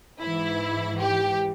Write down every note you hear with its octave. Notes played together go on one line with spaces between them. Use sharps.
G#2 E3 E4
G4